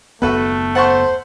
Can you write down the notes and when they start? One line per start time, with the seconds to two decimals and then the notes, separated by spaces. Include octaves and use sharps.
0.22 F#1 D#2 A3 B3 F#4 A4 B4
0.75 C5 F#5 A5 C#6